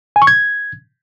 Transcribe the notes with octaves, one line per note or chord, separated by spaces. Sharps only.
G#5
C#6
G#6